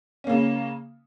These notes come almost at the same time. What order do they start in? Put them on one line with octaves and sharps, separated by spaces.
C#4 A#3 C#3